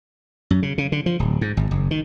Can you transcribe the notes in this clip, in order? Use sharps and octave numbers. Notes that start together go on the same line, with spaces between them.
F#2
C#3
C#3
D3
F3
D1
G#2
G#1
F#1
D#3